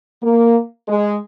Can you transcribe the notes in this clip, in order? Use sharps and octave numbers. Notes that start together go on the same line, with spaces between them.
A#3
G#3